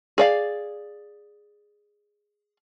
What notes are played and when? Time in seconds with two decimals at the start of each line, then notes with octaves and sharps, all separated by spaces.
0.18 G#4 D5 F5